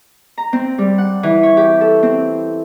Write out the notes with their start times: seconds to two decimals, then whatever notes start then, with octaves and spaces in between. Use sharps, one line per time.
0.38 A#5
0.53 C4
0.78 G3
0.98 F#5
1.23 E3
1.43 C#5
1.57 G4
1.81 A4
2.03 C4